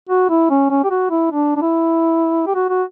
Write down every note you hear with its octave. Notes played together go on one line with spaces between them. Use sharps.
F#4
E4
C#4
C#4
G4
F#4
E4
D4
D4
E4
G4
F#4
F#4